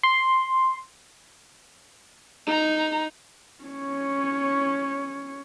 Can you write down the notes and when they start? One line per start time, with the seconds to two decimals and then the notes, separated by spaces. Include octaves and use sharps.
0.03 C6
2.47 D#4 A#5
3.64 C#4 C#5